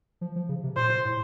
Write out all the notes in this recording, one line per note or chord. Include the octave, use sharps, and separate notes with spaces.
F3
F3
C#3
C3
A#2 C5
A2